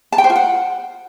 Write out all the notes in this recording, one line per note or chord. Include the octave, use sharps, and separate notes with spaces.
A5
G5
C5
F4
F#5